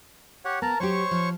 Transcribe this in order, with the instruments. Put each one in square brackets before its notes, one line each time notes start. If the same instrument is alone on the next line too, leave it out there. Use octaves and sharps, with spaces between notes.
[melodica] G4 C#5 F#5
[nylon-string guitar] B3 [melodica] A#4 A5 A#5
[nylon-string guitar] F#3 G4 [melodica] C5 C#5 C#6
[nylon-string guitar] F3